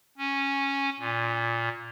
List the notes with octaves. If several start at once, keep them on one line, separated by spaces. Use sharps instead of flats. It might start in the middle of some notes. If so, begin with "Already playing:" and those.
C#4
A#2